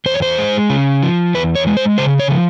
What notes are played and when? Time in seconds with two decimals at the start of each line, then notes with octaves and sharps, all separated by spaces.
0.06 E2 C5
0.15 C#5
0.22 C5
0.38 G#3
0.69 C#3
1.03 F3
1.35 E2 B4
1.55 C#5
1.67 G#3
1.77 C5
1.98 C#3 C5
2.19 C#5
2.30 F3